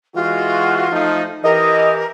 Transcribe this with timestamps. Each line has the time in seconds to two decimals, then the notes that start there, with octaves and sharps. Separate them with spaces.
0.15 E3 G#3 F4 F#4
0.91 F3 A3 D#4
1.44 E3 G4 A#4 D#5